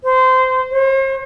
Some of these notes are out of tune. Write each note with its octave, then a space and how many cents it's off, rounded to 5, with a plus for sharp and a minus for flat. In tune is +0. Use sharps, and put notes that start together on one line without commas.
C5 -20
C5 +45